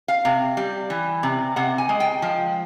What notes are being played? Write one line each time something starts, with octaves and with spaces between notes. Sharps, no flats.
F5
C3
G3
E3
C3
C3 F#5
G#5
G#3
G5
F3